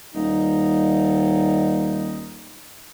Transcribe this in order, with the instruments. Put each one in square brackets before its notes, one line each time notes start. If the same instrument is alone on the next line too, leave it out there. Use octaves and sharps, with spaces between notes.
[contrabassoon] D#1 [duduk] D#4